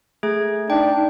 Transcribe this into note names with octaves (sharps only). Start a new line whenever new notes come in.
A3 G#4 G#6
D4 D#4 G5